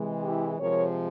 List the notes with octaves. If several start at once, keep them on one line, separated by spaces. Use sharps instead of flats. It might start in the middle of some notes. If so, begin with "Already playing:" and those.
Already playing: C3 E3 G#3
E4 G4
C3 F3 G#3 A#4 C#5